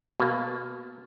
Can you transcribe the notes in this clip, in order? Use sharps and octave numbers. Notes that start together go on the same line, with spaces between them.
B2 A#3